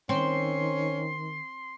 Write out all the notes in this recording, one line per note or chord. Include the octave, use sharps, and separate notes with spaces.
D#3 C4 C#4 C6